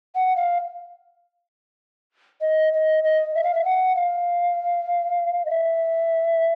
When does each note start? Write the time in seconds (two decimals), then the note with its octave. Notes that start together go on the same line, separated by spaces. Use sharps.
0.15 F#5
0.36 F5
2.41 D#5
2.73 D#5
3.04 D#5
3.35 E5
3.44 F5
3.54 E5
3.65 F#5
3.95 F5
5.45 D#5
5.50 E5